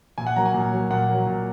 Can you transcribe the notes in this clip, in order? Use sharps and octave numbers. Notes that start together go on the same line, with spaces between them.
A#2 G#5
F#5
F#3 A#3 A#5
G#5
A#2
F#3 A#3
A#2 F#5
F#3 A#3
A#2